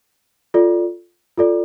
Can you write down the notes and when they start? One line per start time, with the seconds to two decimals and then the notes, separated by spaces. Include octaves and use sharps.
0.54 F4 A4 D5
1.38 F4 A4 D5